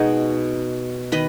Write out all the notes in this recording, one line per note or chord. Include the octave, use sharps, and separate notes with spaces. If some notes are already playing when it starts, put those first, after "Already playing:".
Already playing: B2 G#3 B3 D#4 F#4 G#4
D#3 B4 D#5